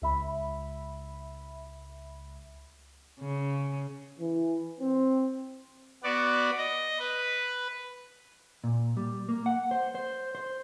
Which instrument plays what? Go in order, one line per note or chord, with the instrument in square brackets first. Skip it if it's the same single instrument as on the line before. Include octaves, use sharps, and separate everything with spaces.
[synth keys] C#2 E5 B5
[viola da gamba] C#3
[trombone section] E3
C4
[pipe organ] B3 F#4 D5
D#5
B4
[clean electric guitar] A#2
G3
A#3
F#5
C5
C5
C5